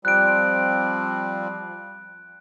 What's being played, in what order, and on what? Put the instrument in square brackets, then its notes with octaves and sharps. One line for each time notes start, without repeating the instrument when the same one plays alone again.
[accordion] F3 G3 C4 [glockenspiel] F#6 D7